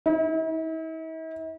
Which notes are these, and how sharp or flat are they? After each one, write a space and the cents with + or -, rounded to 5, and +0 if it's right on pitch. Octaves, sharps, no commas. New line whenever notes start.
E4 -45